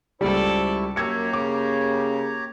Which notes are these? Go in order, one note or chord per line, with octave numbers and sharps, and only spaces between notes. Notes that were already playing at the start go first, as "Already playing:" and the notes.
C#2 G3 E4 A4 C5 D5 C#6
F#2 A#3 G4 C#5 A#5 E6 G#6 C#7
C#3 D6